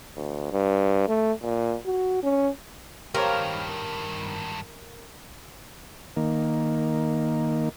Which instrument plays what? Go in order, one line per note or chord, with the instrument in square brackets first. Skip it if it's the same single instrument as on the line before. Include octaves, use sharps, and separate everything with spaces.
[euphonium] D2
G2
A3
A#2
F#4
C#4
[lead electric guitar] G2 D#3 [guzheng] A#3 [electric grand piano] G4 C5 C#5 [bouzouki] A#4
[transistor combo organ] D#3 A#3